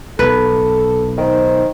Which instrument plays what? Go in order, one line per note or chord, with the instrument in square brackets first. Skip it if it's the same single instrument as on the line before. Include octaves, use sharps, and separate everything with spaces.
[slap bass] B1 [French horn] A4 [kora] B4
[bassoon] D#3 [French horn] C5